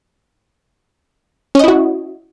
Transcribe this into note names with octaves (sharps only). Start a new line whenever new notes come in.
C#4 E4 F#4 D#5